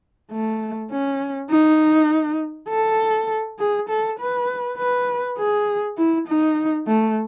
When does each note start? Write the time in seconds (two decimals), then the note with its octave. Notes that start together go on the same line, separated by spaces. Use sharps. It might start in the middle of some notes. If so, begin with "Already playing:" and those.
0.32 A3
0.91 C#4
1.50 D#4
2.69 A4
3.59 G#4
3.89 A4
4.19 B4
4.78 B4
5.38 G#4
5.97 E4
6.28 D#4
6.87 A3